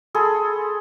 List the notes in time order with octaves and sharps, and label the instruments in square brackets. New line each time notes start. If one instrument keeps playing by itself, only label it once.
[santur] G#4 A4 B5 C6